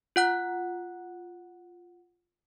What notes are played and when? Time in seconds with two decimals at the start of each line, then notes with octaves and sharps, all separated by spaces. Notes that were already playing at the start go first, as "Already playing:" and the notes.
0.16 F4 F#5 F#6